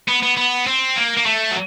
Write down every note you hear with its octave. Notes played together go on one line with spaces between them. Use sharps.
B3
B3
B3
C4
A#3
A#3
A3
F#3